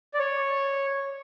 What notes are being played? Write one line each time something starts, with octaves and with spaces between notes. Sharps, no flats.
D5
C#5